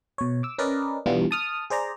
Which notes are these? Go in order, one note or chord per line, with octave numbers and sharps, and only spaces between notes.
B2 C#5
D6 E6
C#4 A#4 B4 D5 D#5
B2 E3 G3 B3 D4 F4
A5 D#6 F6
G#4 C5 D5 A#5